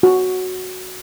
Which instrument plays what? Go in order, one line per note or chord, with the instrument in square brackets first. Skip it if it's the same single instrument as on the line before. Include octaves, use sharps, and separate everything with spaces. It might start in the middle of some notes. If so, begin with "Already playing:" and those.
[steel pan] F#4